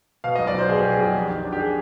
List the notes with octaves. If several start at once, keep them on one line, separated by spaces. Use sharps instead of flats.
B2 F5
B1 D#5
D5
B1 C5
B2 G#4
B2 G4
G#4
B1 G4
F2
D#3
D4
G4
G#4